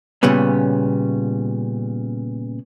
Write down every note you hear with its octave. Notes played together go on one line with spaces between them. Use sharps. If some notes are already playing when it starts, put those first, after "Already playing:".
A#2 C#3 G3 B3 C#4